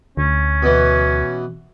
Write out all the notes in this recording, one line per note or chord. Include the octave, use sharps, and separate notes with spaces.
D2 C#4
B2 E3